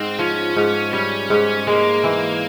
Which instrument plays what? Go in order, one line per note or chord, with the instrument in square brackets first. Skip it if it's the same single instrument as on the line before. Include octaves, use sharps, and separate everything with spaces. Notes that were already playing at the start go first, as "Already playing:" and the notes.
Already playing: [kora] G#2 [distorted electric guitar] C4
[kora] F3 [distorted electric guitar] C#4
[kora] G#2
[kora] G3 [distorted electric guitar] C#4
[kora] G#2
[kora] G#3 [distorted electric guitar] A#3
[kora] E3